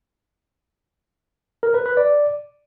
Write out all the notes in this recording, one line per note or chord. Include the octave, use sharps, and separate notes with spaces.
A#4
B4
B4
D5